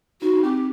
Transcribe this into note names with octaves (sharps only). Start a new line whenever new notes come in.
D#4 F#4
D#4
C4 G4